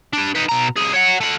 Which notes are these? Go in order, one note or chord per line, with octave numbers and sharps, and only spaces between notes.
D4 G4
D#4 B4
B2 A#5
C2 G#4
C#5 F#5
A3 F#5